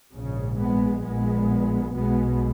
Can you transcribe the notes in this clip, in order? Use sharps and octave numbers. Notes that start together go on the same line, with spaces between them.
A#1 G#2 C#3
G#3 B3
A#1 A#2 G#3 B3
B1 B2 G#3 B3